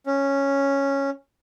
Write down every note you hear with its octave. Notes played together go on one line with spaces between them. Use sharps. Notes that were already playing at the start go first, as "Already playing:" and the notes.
C#4